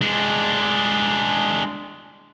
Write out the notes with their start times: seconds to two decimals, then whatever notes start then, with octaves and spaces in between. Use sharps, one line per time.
0.01 G#3 D4